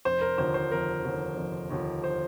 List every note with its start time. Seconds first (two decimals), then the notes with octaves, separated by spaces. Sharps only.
0.05 F1 C5
0.21 A#4
0.38 D#2 D3 F3 C5
0.54 C5
0.71 F1 A#4
1.04 D#2 D3 F3
1.37 F1
1.70 D#2 D3 F3
2.04 C5